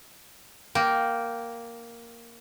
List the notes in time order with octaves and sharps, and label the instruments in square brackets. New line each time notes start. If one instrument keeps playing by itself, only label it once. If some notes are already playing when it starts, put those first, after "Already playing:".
[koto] A#3 [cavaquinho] G5